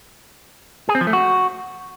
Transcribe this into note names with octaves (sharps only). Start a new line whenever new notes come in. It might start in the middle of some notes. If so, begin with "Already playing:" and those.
G#4
C4
F3
A3
F#4